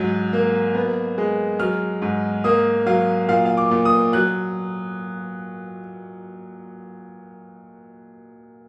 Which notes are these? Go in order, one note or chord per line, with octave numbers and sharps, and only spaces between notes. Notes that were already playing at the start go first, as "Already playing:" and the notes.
Already playing: G#2 F#3
A#3
B3
G#3
F#3 F6
G#2
A#3 D#6
F#3 F5
A#2 F5
F5
D6
A#2
D#6
F#3 F#6